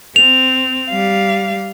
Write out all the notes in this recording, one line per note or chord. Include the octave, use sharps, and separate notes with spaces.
C4 F7
G3 F5